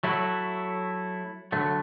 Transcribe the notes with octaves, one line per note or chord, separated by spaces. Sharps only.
F#3 A3 E4
D3 F#3 A3